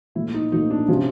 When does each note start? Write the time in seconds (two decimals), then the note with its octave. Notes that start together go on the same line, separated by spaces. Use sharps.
0.15 A#2 F3 A3 E4
0.34 D#4
0.52 A#2 F3 A3 D#4
0.71 D4
0.88 C3 F3 C#4